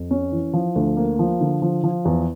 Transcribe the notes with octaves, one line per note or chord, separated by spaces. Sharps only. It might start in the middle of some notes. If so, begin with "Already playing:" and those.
Already playing: F2
C#4
E3
F3
D2
A#3
F3
D3
F3
F3
E2